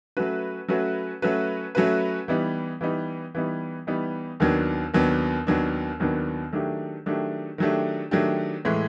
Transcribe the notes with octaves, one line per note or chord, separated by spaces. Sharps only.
F#3 A3 C#4 F#4 B4
F#3 A3 C#4 F#4 B4
F#3 A3 C#4 F#4 B4
F#3 A3 C#4 F#4 B4
E3 G3 B3 D#4
E3 G3 B3 D#4
E3 G3 B3 D#4
E3 G3 B3 D#4
D#2 D#3 F#3 B3 D4
D#2 D#3 F#3 B3 D4
D#2 D#3 F#3 B3 D4
D#2 D#3 F#3 B3 D4
D#3 F#3 A3 D4 G4
D#3 F#3 A3 D4 G4
D#3 F#3 A3 D4 G4
D#3 F#3 A3 D4 G4
A2 E3 G#3